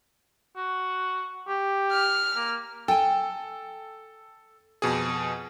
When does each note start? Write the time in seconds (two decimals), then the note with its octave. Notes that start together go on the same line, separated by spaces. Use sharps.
0.56 F#4
1.47 G4
1.92 F6
2.35 A#3
2.88 A4 G5 G#5
4.82 F2 B2 G#4